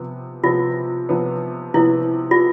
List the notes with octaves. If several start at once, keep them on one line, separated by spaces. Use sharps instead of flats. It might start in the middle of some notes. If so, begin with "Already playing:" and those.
Already playing: C3 F3 B3
C3 F3 B3 F4
C3 F3 B3
C3 F3 B3 E4
F4